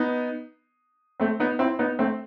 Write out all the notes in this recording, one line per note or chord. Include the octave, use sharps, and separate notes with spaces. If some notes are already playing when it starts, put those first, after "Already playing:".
Already playing: B3 D#4
A3 C4
B3 D#4
C4 E4
B3 D#4
A3 C4